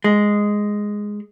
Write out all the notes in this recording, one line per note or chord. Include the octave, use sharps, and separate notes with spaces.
G#3